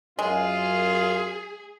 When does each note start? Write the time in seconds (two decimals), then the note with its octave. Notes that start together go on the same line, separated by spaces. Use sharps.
0.19 F#2 G#3 F4 G#4